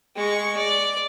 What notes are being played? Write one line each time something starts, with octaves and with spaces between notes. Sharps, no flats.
G#3 C#6
D5